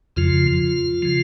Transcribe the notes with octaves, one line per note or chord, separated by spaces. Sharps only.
F2 C#3 F3 F4
C#3 F3